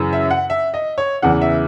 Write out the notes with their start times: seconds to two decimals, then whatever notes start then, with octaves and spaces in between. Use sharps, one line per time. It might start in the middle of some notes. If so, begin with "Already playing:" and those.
Already playing: F#2 C#3 E3
0.13 E5
0.30 F#5
0.50 E5
0.74 D#5
0.98 C#5
1.22 E2 C#3 E3 F#5
1.41 E5